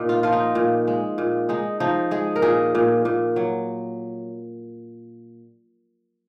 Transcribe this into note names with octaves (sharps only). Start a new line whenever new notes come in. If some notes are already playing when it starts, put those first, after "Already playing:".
Already playing: A#2 D#4
F4
F3 F4
D#4
A#2
G#3
A#2
G#3 D#4
F3 D#4
G#3 G#4
A#4
A#2 G#4
A#2
A#2
F#3